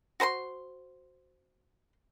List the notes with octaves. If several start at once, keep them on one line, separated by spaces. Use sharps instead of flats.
F#4 C5 A#5 C6